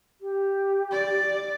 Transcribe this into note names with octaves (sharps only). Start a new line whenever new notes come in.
G4
D5